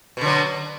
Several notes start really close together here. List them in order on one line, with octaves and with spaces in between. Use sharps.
B2 D3 F#3